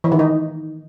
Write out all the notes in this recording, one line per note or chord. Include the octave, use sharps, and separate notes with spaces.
E3
D#3
D#4